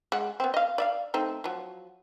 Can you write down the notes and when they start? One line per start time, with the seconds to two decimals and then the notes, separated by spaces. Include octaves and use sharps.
0.12 G#3 F#5
0.40 B3 C4
0.54 D#5 F5
0.78 D5 E5 F5
1.14 A3 C4 D#4
1.44 F3 F#3